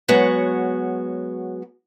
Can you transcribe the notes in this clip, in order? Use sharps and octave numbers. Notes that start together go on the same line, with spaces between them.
F#3 G#3 B3 F#4 C#5